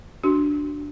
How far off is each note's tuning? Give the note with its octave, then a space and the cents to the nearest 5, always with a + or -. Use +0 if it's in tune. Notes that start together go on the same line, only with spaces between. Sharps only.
D4 +0 F#4 +0